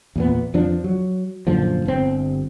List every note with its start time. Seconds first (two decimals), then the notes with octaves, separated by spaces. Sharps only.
0.16 E2 A#2 B3
0.54 F2 F3 D4
0.84 F#3
1.47 F#2 A#2 D3 F3
1.85 G1 C4